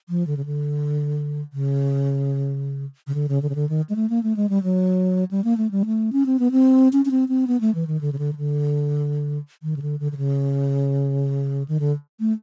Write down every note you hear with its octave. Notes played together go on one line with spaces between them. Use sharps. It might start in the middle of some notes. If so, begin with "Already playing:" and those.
F3
D3
C#3
D3
C#3
C#3
D3
C#3
D3
C#3
D3
D#3
G#3
A3
A#3
A3
G#3
G3
F#3
G3
A#3
A3
G3
A3
C#4
C4
B3
C4
C#4
C#4
C4
C4
B3
A3
E3
D#3
D3
C#3
D3
D#3
D3
D#3
C#3
D3
D3
D3
C#3
D#3
D3
A3